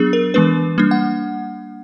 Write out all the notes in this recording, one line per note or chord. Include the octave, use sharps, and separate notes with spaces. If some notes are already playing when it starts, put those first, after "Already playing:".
Already playing: F#3 B3 D4 G#4
A#4
E3 G#3 B3 D4 B4
G3 A#3 D4
F#5